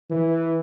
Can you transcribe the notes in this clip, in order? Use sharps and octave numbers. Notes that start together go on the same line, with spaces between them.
E3